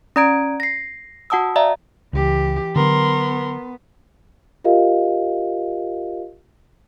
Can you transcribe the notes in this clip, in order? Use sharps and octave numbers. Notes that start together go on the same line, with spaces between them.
C#4 D5 A#5 G#6 D7
A#6 C7
F#4 F#5 A5 D#6 E6
D5 E5 F5 A#5
C#2 E3 G4
D3 F#3 B3 A#4 C6
F4 G4 A#4 D#5 F5